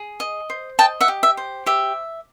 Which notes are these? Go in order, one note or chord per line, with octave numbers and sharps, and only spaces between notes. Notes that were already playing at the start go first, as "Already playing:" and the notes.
Already playing: G#4
D#5
C5
D#5 G5 A5
E5 F#5
G4
E5
C5
G4 E5